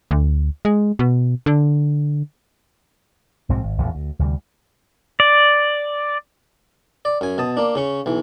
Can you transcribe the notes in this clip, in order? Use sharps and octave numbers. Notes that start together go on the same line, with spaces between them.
D2
G#3
B2
D3
B1 G#2 F3 C4
G#1
G#1 E2 A2
D2
D2 C3 G3
D5
D5
F#2 G#5
B2 A5 D#6
A#3 D4
C#3 C#4 C#6
B1 E3